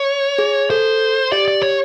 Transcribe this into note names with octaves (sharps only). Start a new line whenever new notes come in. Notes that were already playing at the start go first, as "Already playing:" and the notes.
Already playing: C#5
G#4
A4 C5
G4 D5
D5
C#5